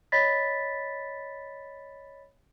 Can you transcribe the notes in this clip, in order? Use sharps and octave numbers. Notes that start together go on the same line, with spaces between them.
C#5 D#5 B5 A6 B6